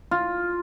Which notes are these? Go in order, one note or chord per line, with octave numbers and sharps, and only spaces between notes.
F4